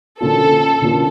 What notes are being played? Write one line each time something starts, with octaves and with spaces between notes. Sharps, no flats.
D3 F3 A#3 C#4 F4 A4
D3 F3 A#3 C#4 F4